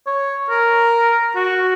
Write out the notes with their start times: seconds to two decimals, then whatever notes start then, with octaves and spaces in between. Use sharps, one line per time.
0.07 C#5
0.50 A#4
1.36 F#4